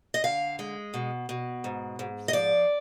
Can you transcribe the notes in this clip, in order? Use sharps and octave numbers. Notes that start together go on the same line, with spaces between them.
D#5
D3 F5
G#3
B2
B2
G#2
G#2
D#5
F3 D5